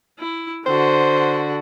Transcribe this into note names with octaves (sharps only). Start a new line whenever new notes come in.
E4
D3 F#4 C5